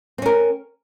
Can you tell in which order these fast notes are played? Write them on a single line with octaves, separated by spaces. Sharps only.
C4 C#4 A#4